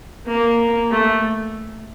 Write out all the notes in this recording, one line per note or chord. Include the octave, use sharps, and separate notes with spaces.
A#3
A3